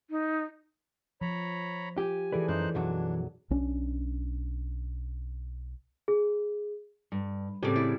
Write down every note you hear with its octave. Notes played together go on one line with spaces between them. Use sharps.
D#4
F3 C#5 A#5 B5
F4 G4 G#5
E3 E4 G#4 A4 B4 D5
F#2 D#4 C5 F#6
B1 F#2 F#3 D4
B1 C#4 D4
G#4
G2
A2 C#3 G3 C4 G#4 D5
E4